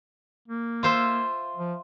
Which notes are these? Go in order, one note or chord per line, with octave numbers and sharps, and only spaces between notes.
A#3
F4 C5 E5
F3